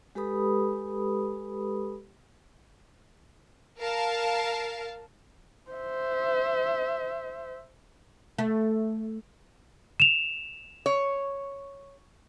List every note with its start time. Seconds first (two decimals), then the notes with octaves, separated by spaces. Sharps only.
0.15 G#3 G4 A4 B4 B5 D#6
3.80 A#4 F5 A5
5.71 C5 E5
8.38 A3
10.00 E7 F7
10.86 C#5